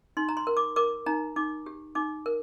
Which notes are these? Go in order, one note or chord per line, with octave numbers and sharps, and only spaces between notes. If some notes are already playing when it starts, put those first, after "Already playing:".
D#4 C6
A#5
C6
A#4
D6
A#4 D6
D#4 A#5
D#4 D6
G4
D#4 D6
A#4